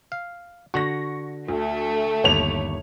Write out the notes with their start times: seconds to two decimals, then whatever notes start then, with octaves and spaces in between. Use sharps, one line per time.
0.12 F5
0.74 D3 F#4 C#6 A#6
1.49 D2 A3
2.24 G1 D#2 C#5 F7